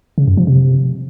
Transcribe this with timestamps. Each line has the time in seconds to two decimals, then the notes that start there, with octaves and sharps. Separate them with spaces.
0.18 C#3
0.28 F#2
0.37 F3
0.47 C3